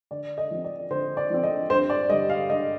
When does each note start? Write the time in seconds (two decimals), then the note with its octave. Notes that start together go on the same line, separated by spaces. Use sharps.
0.11 D3 D5
0.38 D#5
0.51 F3 C4
0.64 D5
0.90 D3 C5
1.17 D5
1.30 F3 C4
1.43 D#5
1.70 G2 C5
1.90 D5
2.10 D3 G3 D#5
2.30 F5
2.49 G2 D#5